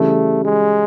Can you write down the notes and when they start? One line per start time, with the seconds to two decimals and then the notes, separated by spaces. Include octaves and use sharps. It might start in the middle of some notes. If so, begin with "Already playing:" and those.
Already playing: C#3 E3 G3 A3
0.45 G#3